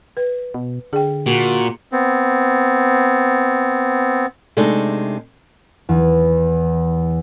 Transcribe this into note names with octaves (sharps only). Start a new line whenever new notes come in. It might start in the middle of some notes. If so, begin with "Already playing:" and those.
B4
B2
D3 G#4 G5
A#2 F#4
B3 C4
C3 G#3 A3 D4 D#4 A4
E2